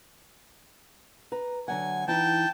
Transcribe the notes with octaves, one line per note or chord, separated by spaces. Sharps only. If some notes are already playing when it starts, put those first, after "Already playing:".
B4 A#5
D3 F#3 F#5 G#5
E3 D#4 E4 G5 A5